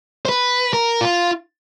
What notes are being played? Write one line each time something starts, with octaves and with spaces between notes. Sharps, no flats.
C5
B4
A#4
F4